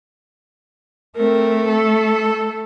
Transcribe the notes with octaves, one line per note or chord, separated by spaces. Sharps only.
A3 C4 A#4
A4